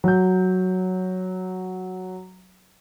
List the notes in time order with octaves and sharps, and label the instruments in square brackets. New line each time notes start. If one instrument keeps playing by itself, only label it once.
[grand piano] F#3 G6